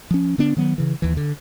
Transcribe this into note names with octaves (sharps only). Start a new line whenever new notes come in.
F3 C#4
D3 B3 D4
D#3 F#3 B3
C#3 E3
D#2 E3
D3